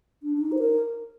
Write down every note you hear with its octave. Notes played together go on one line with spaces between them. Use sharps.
D4
D4
D#4
C5
A#4